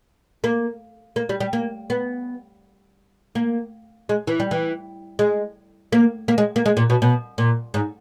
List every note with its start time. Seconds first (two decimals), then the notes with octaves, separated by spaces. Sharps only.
0.44 A#3
1.16 A#3
1.29 G3
1.40 G3
1.53 A#3
1.90 B3
3.35 A#3
4.09 G#3
4.27 E3
4.40 G3
4.51 E3
5.19 G#3
5.92 A#3
6.28 A#3
6.38 G#3
6.56 A#3
6.66 G#3
6.77 A#2
6.90 B2
7.02 B2
7.38 A#2
7.74 G#2